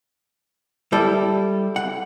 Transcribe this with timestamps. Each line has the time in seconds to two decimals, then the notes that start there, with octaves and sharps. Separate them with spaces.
0.92 G3 E4 A4
1.76 F#5